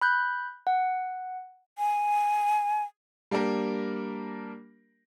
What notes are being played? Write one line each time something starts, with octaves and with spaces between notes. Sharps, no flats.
B5 F#6 G6
F#5
G#5
G3 A#3 D4 G4 A#4